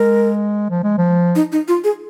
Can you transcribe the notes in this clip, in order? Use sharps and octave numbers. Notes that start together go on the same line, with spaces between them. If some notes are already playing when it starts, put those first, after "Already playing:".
Already playing: G#3 A#4
F3
G#3
F3
D#4
D#4
F4
G#4